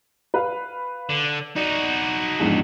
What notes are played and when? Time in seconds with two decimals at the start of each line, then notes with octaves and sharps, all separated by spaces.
0.34 B4 F5
1.09 D3
1.56 D#4 F#4 D5
2.40 A#1 E2 G#2